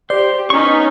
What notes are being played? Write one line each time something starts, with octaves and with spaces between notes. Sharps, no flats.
G4 C5 D5
B3 C#4 D#4 C#6